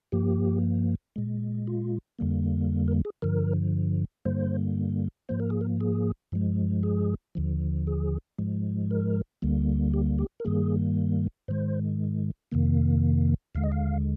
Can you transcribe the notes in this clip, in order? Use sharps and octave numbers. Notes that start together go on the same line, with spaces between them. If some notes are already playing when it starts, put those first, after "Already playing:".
G2 F3 A#3 G4
A#2 G#3
F4
F2 D3 G3 A#3
A#4
G#4
G2 D3 F3 A#4
G2 D3 G3 A#3 C5
G#2 F3 A#3 C5
A#4
G#4
A#4
G#4
G2 F3 G#3
G#4
D#2 D3 F3
G#4
G#2 F3 G#3
A#4
D2 D3 G3 A#3
G4
G4
A#4
G2 D#3 G3 A#3 G#4
G#2 D#3 G#3 C5
F2 C3 D#3 A#3
D#2 D3 G#3 F5
D#5
F5